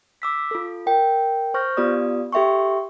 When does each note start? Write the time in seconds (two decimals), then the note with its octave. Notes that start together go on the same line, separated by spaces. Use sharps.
0.22 D6 E6 B6
0.51 F4 A4
0.86 A#4 G5
1.54 C5 C#6 F6 G6 A#6
1.77 B3 F4 G4 D5 D#6
2.33 G4 A4 E5 G5 C6 C#6